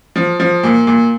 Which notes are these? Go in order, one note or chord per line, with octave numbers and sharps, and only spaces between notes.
F3
F3
A#2
A#2